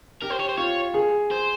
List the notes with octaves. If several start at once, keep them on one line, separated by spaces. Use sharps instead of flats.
G4 A#4
C5
C#5
C5
F4 C#5
G#4
C5